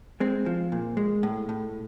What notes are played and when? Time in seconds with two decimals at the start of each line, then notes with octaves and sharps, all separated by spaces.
0.20 G#3 C4
0.46 F3
0.72 A#2
0.97 G#3
1.23 A2
1.49 A2